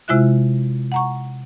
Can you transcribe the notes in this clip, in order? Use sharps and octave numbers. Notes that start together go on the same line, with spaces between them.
C3 G#3 E4 F4 E5 F#6
F#5 A#5 C#6